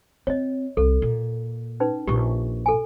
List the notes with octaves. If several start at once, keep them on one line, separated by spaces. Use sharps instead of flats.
C4 C#5 D#5
C2 A4
A#2
C#4 D#4 B4
A#1 A#2 G4 C#6
A4 G#5